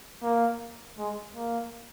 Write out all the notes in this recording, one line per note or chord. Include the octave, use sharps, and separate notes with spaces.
A#3
G#3
A#3